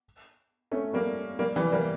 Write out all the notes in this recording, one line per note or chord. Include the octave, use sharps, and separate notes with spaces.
A3 C#4
G3 A#3
G3 A#3
E3 G3
G3 A#3